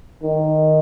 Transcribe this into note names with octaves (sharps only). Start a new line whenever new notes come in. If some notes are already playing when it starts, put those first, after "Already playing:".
D#3